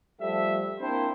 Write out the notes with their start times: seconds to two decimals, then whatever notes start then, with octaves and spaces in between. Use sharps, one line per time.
0.21 F3 G3 A3 E5
0.81 A#3 C4 D4 E4 C5